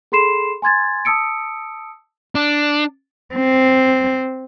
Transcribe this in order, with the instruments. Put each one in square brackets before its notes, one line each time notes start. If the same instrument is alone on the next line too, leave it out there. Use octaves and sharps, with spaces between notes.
[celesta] G#4 A4 B5 C6 C7 E7
G#5 C6 G#6 A6
A5 D#6 E6 C#7 D7
[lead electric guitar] D4
[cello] C4